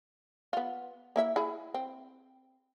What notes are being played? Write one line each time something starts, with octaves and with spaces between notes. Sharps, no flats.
B3 F4
A#3 E4 E5
E4 G#4
C4